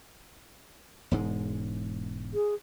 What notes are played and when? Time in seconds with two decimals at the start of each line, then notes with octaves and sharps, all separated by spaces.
1.11 E1 G#2 G#3
2.34 G#4